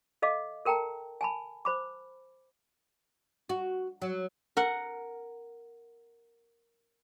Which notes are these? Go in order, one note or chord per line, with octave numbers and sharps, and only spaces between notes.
A4 D#5 F5 D6
A4 A#4 G5 A5 A#5
G#5 A5 B5
C5 B5 D6
F#4
F#3
A#4 F#5